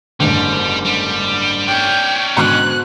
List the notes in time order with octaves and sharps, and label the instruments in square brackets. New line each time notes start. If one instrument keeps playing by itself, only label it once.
[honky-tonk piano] F#1 G#2 D3 [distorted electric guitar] G3
[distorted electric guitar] G3
[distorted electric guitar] C#4 D5 [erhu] G5
[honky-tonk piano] G#2 B2 D3 [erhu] F#6